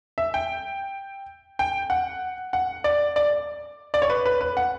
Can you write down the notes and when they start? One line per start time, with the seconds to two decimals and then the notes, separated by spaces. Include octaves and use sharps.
0.18 E5
0.34 G5
1.59 G5
1.90 F#5
2.53 F#5
2.84 D5
3.16 D5
3.94 D5
4.02 C#5
4.10 B4
4.26 B4
4.41 B4
4.57 F#5